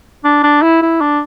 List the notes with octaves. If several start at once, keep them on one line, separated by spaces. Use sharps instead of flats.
D4
D4
E4
E4
D4